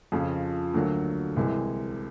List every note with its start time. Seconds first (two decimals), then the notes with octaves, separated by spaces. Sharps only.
0.12 F2 C#3 F3
0.74 D2 D3 F#3 A#3
1.36 C2 C3 E3 G#3